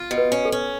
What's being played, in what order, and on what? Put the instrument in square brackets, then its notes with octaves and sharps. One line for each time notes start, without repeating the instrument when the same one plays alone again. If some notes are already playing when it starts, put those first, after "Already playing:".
Already playing: [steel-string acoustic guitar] F4
B2
[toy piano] B4
[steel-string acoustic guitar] C#4
[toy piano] A4
[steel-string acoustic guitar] C#4